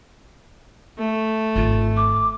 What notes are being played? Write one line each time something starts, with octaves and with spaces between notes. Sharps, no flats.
A3
G#1 D#4 F4
D6